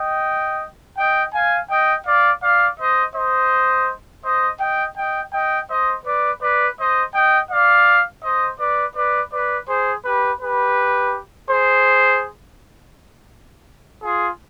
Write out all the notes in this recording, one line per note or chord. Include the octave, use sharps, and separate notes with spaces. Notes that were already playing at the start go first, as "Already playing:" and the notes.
Already playing: D#5 G5
D#5 G5
F5 G#5
D#5 G5
D5 F5
D5 F5
C5 D#5
C5 D#5
C5 D#5
D#5 G5
D#5 G5
D#5 G5
C5 D#5
B4 D5
B4 D5
C5 D#5
D#5 G5
D5 F5
C5 D#5
B4 D5
B4 D5
B4 D5
G#4 C5
G4 B4
G4 B4
G#4 C5
F4 G#4